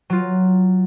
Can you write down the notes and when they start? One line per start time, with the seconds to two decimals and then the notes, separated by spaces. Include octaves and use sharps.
0.10 F#3 F4